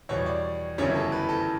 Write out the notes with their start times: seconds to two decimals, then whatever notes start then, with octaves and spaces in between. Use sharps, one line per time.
0.09 E2 B2 G3 C#5
0.26 D5
0.78 G1 F#2 C#3 E3 G3 C#5
0.95 A4
1.12 B4
1.29 A4